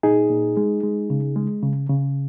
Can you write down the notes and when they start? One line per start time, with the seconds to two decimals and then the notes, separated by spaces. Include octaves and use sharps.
0.03 A#2 D#4 G#4
0.30 A#2
0.57 G#3
0.83 G#3
1.10 C#3
1.36 G#3
1.63 C#3
1.90 C#3